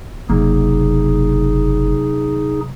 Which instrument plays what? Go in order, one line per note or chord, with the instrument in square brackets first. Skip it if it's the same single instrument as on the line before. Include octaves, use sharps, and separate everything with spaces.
[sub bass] F#1 [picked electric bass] C3 F#3 A#3 [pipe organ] D#4 G#4